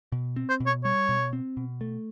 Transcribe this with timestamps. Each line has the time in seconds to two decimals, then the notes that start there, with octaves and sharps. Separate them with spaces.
0.12 B2
0.36 C4
0.49 C5
0.60 B2
0.66 C#5
0.84 G3 C#5
1.09 B2
1.33 C4
1.57 B2
1.81 A3